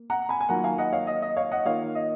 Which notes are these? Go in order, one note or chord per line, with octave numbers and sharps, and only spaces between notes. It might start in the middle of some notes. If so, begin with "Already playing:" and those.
Already playing: A#3
F#5 A#5
G#5 B5
G#5
D#3 F#3 A#3 F4 F#5 A#5
F5 G#5
D#5 F#5
C#5 F5
D#5
D#5
C#5 F5
D#5 F#5
D#3 A#3 F4 C#5 F5
D#5